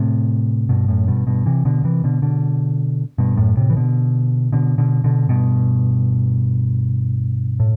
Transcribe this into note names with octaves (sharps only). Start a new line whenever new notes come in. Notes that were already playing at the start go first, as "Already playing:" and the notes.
Already playing: A2 C3
G2 B2
F#2 A2
G2 B2
G2 B2
C3 E3
B2 D3
C3 E3
B2 D3
B2 D3
G2 B2
F#2 A2
A2 C3
E3
B2 D3
B2 D3
B2 D3
B2 D3
G2 B2
A2